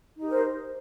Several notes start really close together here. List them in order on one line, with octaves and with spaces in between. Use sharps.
D#4 G4 A#4 C5